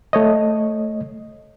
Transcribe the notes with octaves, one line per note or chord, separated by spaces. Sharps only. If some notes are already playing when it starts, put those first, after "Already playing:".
A3 C#5 D#5